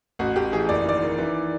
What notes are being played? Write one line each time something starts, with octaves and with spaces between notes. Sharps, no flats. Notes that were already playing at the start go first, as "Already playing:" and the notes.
A1 F#4
A1 G4
E3 G#4
F#1 D5
D#3 D5
D#3
E3